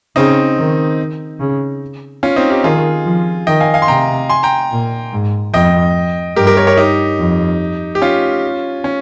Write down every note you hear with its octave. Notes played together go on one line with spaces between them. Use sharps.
C#3 C4 D#4
D#3
C#3
C#4 F4
C4 D#4
D#4 G4
D#3 F4 G#4
F3
D#3 D#5 G5
F5 G#5
F5 G#5
C6
C3 G5 A#5
G#5 C6
G5 A#5
A#2
G#2
F2 D#5 G5
G2 G4 A#4
G4 A#4
A#4 C#5
A#4 C#5
D#4 G4
F2
G4
C#4 F4
C#4